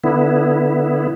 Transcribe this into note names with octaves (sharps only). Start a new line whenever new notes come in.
D3 B3 E4